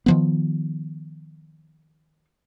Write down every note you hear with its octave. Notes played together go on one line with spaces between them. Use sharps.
D#3 F3 B3